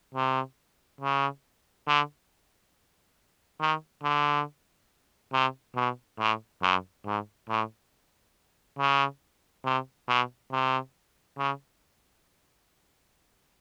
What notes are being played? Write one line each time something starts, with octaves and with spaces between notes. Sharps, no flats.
C3
C#3
D3
D#3
D3
C3
B2
A2
F#2
G#2
A2
C#3
C3
B2
C3
C#3